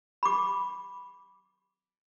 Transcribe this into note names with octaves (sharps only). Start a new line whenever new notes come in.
B5 D6